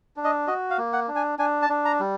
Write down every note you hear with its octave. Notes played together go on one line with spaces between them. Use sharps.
D4
D#5
F#4 D#5
F5
A#3
F#5
D4
G#5
D4 G#5
A5
D4
A#5
G3